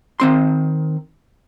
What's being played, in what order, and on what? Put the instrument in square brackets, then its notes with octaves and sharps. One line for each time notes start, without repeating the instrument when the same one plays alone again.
[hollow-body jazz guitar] D#3 C4 C6